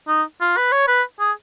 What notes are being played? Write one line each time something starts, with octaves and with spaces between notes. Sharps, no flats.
D#4
F4
B4
C#5
B4
G#4